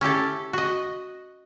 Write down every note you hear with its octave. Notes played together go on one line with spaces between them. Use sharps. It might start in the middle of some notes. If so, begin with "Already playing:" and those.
C#4 E4 G4 A4
F#4 D#5